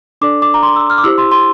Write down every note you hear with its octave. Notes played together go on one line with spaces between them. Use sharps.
D4 A4 D5 D6
D6
A#5
C6
E6
F6
D6
E4 G4 C5 E6
C6
C6